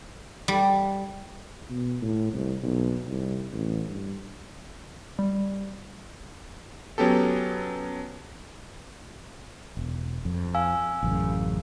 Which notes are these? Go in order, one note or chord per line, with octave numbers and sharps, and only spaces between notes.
G3
B2
A2
C2
B1
C2
A1
G2
G3
F#3 B3 C#4 G4 A4
E1
F2
F5 G#5 E6
A1 F#2 C#3